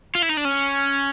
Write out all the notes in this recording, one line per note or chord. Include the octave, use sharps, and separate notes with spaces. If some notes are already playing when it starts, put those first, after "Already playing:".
F4
E4
D#4
D4
C#4